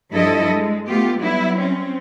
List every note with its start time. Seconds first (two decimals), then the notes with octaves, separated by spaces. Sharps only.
0.11 G2 F3 E4 A4 D#5
0.52 G#3
0.88 A3 B3 F4 G4
1.19 F#3 G3 B3 E4
1.57 C4 C#4